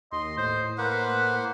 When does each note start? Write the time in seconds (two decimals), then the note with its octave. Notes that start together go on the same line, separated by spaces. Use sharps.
0.12 D#2 D#5 C6
0.37 A2 C5
0.78 A#3 B4 C5 F#5